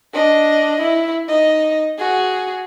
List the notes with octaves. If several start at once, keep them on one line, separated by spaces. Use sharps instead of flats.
D4 D#5
E4
D#4 D#5
F#4 G#4